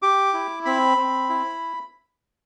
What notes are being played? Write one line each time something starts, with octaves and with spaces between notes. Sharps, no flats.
G4 D6
E4
C4 B5
C4
E4